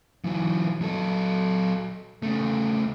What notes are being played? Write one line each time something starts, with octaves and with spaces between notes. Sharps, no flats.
E3 F#3
F#3 A4
C#3 A3